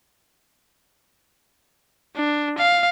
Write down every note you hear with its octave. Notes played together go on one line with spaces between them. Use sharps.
D4
F5